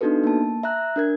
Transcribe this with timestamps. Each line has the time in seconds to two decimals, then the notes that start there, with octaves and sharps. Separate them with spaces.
0.01 B3 D4 D#4 F#4 A4 B4
0.24 A#3 A5
0.63 E5 A#5 F#6
0.96 D4 A#4 G#6